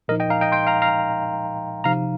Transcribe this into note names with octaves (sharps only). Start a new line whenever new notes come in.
A#2 F3 D#4 A#4 D#5
D#5 G5
F5 A#5
D#5 G5
G5 C6
F5 A#5
F5 A#5
C3 F3 D#4 F5 A#5